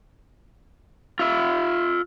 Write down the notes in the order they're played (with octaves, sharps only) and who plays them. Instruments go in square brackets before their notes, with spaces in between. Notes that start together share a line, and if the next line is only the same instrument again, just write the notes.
[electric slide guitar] F4 E5